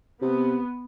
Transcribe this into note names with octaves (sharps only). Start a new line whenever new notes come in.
C3 B3